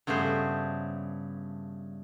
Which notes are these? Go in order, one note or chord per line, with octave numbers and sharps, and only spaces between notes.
G2 C#3 A3 B3 C5 G#5